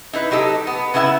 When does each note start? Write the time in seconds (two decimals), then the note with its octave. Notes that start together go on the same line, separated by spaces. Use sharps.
0.13 D#4 E4 B4
0.31 F#3 D#4 G4 A4
0.67 B3
0.94 C#3 B3 E4 E5 F#5